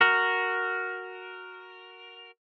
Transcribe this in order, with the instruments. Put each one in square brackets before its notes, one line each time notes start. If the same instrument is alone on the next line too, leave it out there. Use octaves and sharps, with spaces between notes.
[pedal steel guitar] F#4 A#4